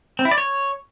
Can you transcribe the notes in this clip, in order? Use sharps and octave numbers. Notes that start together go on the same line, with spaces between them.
C4
E4
D5
C#5